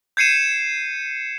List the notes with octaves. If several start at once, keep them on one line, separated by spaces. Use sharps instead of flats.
G6 G#6 C7 C#7 D#7 E7